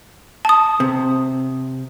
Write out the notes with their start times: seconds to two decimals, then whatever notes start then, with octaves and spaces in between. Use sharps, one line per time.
0.45 A5 D#6
0.80 C3